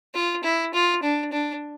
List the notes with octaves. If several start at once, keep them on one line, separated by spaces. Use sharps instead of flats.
F4
E4
F4
D4
D4